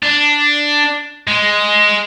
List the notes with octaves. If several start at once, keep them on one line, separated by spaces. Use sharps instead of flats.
D4
G#3